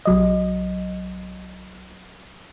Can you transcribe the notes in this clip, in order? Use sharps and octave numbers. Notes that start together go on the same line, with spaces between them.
B1 F#3 D#5